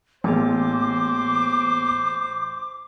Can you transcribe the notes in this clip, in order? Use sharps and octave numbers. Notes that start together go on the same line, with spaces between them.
A1 A#3 B3 G#4 C5 D6